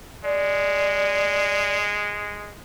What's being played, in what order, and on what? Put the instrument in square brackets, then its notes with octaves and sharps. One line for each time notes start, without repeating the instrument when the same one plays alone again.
[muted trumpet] G#3 [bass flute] D5